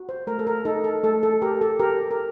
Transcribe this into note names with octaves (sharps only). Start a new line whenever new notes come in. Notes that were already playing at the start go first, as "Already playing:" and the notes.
Already playing: F#4
C5
A3 A#4
A4
A#4
D#4 A4
A4
A3 A4
A4
G4 A#4
A4
G4 A#4
A#4